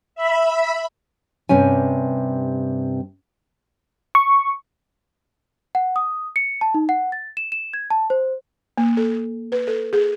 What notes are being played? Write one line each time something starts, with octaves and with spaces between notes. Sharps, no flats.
E5 B5
G2 C3 C#4 G#5
C#6
F#5
D#6
C#7
A5
D#4
F#5
A6
E7
E7
G#6
A5
C5
A#3
A4
B4
A4
G#4